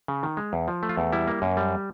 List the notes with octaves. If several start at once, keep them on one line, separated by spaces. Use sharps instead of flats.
C#3
D#3
G#3
E2
F3
A3
F4
E2
G3 E4
A#3
F#2
G3